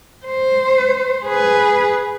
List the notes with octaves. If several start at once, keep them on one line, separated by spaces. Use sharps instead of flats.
C5
G#4 B4